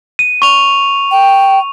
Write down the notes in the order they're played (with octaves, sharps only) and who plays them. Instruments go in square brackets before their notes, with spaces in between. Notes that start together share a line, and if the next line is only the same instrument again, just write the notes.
[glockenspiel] D#7
C#6 F7
[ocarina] G5